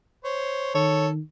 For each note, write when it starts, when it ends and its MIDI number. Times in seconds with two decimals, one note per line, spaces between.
0.24 0.74 72
0.24 0.74 73
0.75 1.20 51
0.75 1.08 69
0.75 1.08 73